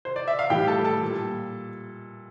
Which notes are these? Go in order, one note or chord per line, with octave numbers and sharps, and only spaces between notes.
C5
D5
E5
F5
A2 E3 G3 G4 G5
A4 A5
A4 A5
A#2 G3